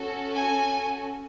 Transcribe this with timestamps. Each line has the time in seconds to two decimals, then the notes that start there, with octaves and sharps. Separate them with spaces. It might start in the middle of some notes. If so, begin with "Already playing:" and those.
Already playing: C#4 F#4 A4
0.33 G#5